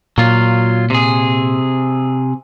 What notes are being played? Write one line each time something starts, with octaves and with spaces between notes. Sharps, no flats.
A#2 F#3 F4
C3 G#4